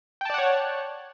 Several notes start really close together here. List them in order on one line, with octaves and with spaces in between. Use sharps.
G5 A5 D5 F#5 C#5